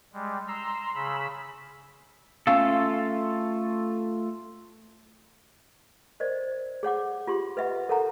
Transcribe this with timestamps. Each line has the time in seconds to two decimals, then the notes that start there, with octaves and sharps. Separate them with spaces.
0.13 G3 G#3
0.48 A#5 C6 E6
0.95 C#3 B5 E6
2.47 A3 C#4 F4 A4 F5
6.20 A#4 C5 D5 D#5
6.83 G#4 C#5 F#5 D6
7.27 F4 G4 C6
7.57 B4 D#5 E5 F#5
7.89 A4 A#4 C#5 F#5 A#5